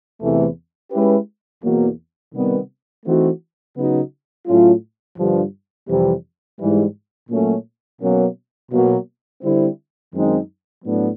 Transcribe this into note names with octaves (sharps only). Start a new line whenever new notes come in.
E2 C3 E3 A3
G#3 C#4 E4 G4 B4
E2 B2 F#3 A#3
C3 D#3 G3 B3
E3 A3 C4 D#4 F#4
C#3 F#3 B3 D#4 F#4
A2 F#3 A3 C#4 F4
G2 D3 F3
F2 C3 E3 G3
G#2 E3 G3
A#2 F#3 A3 C#4
B2 F#3 A#3 C#4
B2 F#3 A#3
D3 G3 C4 E4
F#2 D#3 G#3 C4 D#4
A2 F#3 B3 D4